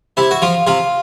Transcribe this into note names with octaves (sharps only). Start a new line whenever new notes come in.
C3 E4
F#4
F3 F4
C3 F4